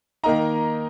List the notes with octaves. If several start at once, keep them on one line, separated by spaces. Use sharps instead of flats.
D#3 A#3 D#4 A#5